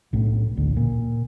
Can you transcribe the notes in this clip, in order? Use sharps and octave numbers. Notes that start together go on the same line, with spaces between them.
B1 A2
A1 D2 D3
A#2